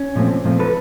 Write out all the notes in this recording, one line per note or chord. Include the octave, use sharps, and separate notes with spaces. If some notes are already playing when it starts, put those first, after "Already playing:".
Already playing: C#4
A#2 F3 A3 C4
A#2 F3 A3 C4
A4 B4